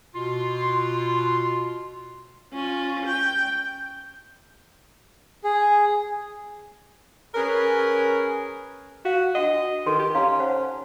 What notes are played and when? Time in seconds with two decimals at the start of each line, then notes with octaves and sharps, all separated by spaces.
0.15 B2 F4 C6
2.53 C#4 F4
3.06 G5
5.44 G#4
7.35 C#4 G#4 A#4 B4 C#5
9.05 F#4 F5
9.35 D4 F#4 D#5 F#5
9.86 D#3 A4 B4 C6
9.99 D#4 G4
10.15 C#4 F5 A#5 C6
10.40 C5 F#5 A5